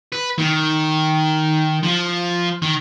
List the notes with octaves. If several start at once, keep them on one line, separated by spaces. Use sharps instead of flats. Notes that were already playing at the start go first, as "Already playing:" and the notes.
B4
D#3
F3
D#3